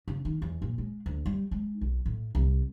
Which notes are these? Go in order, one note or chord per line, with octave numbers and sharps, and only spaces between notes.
C#3
D#3
E2
A#2
G#3
D2
G3
G#3
B1
A2
C2